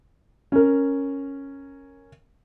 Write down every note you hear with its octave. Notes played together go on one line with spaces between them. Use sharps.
C#4 A#4